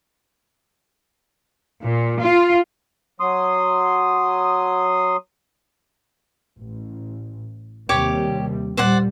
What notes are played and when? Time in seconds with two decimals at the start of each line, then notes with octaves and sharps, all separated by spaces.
1.83 A#2
2.21 F4
3.20 F#3 C6 D#6
6.60 A1
7.89 D#2 C3 G3 G4 C#5 D6
8.77 A#2 G3 C5 D5 F#5